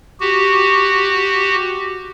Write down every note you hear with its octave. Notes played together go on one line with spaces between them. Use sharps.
F#4 G4